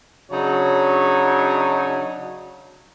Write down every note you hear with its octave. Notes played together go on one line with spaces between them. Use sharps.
C#3 F#3 D4 D#4 C#5